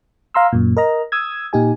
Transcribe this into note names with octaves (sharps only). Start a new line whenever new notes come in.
F5 A#5 C6 E6
F#2 A#2
A#4 D#5 A#5
D#6 E6 G#6
A#2 D#4 G4 G#5